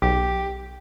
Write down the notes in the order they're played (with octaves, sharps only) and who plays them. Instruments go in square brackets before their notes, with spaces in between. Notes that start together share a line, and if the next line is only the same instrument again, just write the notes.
[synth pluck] B1 [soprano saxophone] G4